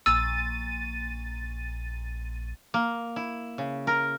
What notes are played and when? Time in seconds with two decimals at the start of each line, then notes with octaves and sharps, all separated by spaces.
0.06 A#1 E6 A6 D#7
2.74 A#3
3.16 E4
3.58 C#3
3.87 A#4